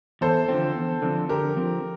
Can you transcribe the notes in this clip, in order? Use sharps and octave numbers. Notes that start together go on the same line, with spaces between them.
E2 A4 C5
D3 F3 C4
E2
D3 F3 C4
D3 G4 A#4
F3 C4